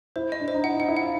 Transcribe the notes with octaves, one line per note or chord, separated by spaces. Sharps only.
E4 C5
D#5
D4
C5
D#4
E4 F#5
D#4
F#5
E4
F4 F#5